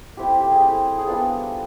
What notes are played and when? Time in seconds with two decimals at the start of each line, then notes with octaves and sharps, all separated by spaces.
0.17 A3 C4 E4 G4
0.40 G4
0.51 G#4
0.62 A3 C4 E4
0.98 G#4
1.07 G3 B3 D4 F4 A4